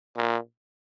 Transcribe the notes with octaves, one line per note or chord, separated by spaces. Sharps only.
A#2